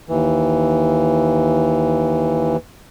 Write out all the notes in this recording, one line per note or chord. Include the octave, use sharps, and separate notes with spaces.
D#2 E3